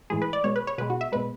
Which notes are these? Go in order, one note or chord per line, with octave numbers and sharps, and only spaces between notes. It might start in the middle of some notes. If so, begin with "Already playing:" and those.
A2 E3 G#3 G#4
B4
D5
B2 G#3 C#5
B4
C#5
B2 G#3 B4
F#4
E5
B2 G#3 B4